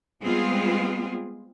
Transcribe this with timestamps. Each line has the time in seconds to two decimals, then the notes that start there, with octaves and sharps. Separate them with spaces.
0.22 G3 G#3 B3 C4 F4 G#4